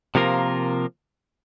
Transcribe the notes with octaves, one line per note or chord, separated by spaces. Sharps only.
C3 F3 A#3 F4 A#4